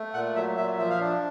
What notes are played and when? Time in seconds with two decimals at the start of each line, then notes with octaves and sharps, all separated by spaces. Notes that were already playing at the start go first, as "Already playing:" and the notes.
Already playing: A3
0.14 A#2 F#5
0.35 F#3 E5
0.57 A#2 E5
0.78 F3 E5
0.90 F5
1.00 D4